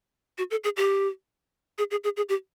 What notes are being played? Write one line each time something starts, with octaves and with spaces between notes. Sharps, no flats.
F#4
A4
G#4
G4
G#4
G#4
G#4
G#4
G4